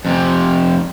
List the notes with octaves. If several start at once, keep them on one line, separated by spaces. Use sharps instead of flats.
F2 C3